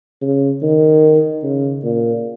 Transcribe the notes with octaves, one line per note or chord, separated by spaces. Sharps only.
C#3
D#3
C#3
A#2